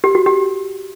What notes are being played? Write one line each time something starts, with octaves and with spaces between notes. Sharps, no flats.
G4
F#4
G4